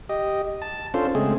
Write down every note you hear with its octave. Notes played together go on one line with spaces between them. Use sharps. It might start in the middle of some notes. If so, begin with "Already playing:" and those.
G4 D#5
A5
C#4 D4 F4 A4 C5
C#3 G#3 A3 C4 G#4